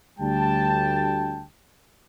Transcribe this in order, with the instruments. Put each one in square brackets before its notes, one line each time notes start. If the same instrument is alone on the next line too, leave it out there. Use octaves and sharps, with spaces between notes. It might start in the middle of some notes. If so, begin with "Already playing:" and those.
[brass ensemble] D2 G3 G5 A5